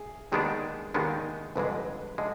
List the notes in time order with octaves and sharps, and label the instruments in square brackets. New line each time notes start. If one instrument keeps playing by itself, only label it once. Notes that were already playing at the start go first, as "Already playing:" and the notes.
Already playing: [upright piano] G#4
[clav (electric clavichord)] D#2 D#3 G#3 B3 D4 [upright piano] G#4
[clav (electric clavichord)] D#2 D#3 G#3 B3 D4 [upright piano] G#4
[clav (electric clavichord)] G1 F2 D3 G#3 [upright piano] B4
[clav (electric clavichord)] D3 G#3 [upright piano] D#5